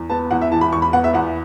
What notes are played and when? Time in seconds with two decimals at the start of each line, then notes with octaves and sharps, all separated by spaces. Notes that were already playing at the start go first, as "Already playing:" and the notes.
Already playing: E2
0.10 B3 A5
0.31 E2 F#5
0.41 E5
0.51 E3 A5
0.61 B5
0.72 E2 C#6
0.82 B5
0.93 B3 F#5
1.04 E5
1.14 E2 F#5